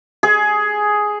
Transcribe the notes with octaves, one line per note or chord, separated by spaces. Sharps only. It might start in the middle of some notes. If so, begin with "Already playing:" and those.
G#4